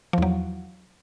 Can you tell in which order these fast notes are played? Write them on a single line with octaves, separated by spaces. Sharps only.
F3 E2 F#3